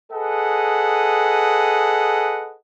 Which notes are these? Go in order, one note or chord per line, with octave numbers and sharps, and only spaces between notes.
G#4 A4 B4 D#5 F#5